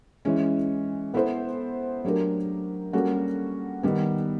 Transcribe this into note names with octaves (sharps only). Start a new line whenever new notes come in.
E3 G#3 C#4
B3 E4 A4 C5
F#3 A3 D4 G4 A#4
G3 A#3 C#4 F#4 A4
D#3 G3 B3